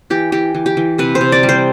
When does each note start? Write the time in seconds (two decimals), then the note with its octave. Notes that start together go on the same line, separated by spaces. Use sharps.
0.10 E3 G4
0.32 E3 G4
0.55 E3
0.66 G4
0.77 E3
0.98 C3 B4
1.15 C5
1.21 C3
1.32 D5
1.43 G3
1.49 C5